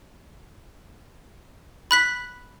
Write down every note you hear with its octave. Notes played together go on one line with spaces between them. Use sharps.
B5 F#6 B6